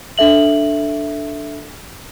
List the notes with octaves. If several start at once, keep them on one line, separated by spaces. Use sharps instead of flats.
D4 A4 E5 F#7